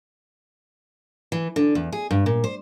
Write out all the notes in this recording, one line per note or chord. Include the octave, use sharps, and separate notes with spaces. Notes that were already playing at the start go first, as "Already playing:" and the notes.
E3
D3
E2
G#4
G2
A#2
C5